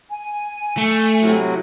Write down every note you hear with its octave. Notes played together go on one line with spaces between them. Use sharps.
G#5
A3
A2 C3 F#3